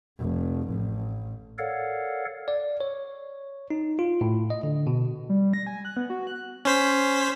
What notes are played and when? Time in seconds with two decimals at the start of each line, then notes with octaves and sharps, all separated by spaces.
0.20 F1
0.69 A1
1.58 A4 A#4 C#5 D5 F5 F#5
2.48 D5
2.80 C#5
3.70 D#4
3.99 F4
4.21 A2
4.50 D#5
4.63 D3
4.87 B2
5.29 G3
5.54 A#6
5.67 G#5
5.85 F#6
5.97 B3
6.10 F#4
6.27 F#6
6.65 C#4 C5 B6